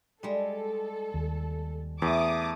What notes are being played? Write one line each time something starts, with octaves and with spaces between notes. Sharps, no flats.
G3 G#3 A4
D#2
E2 A3 A5 D6 D#6